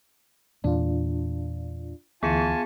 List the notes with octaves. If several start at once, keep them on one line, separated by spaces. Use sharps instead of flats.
E2 A#2 D4 F4
D2 E3 B3 F4 G#4 G#5 A5 C#7